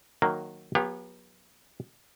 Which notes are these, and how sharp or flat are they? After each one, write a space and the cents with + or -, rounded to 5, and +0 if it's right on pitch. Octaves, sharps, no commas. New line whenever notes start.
D#3 -10 F#3 -5 A#3 -10
F#3 -35 B3 -30 G4 +30